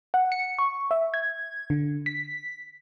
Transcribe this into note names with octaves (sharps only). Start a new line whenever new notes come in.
F#5
C#7
C#6
E5
G#6
D3
B6